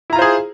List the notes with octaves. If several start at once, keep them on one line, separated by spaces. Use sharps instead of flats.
E4 F4 G#4 C5 A#5